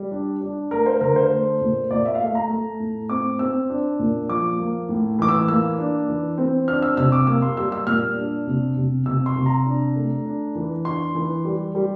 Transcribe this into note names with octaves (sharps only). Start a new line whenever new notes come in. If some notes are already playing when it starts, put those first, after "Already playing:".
Already playing: G3
D4
D4
A3 A#4
C5
D3 A#4
C5
A3
A#2
A#2 D5
E5
F5
A3 E5
A#5
A3
A2
C4 D6
C4 E6
D4
A#2
F3 D6
A#3
A2
E3 D6
E6
A#3 E6
D4
E3
C4
D4 F6
E6
C3 E6
D6
A#3 E6
C6
G3 E6
E6
A#2 F6
D4
C3
C3
C3 E6
C6
C3
A#5
D4
A3
D4
E3
D4 C6
E3
G3
G3